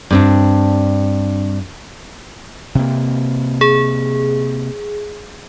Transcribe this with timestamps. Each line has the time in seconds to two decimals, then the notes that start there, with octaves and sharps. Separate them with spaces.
0.11 G2 C4 D4
2.75 C3 A#3
3.61 G#4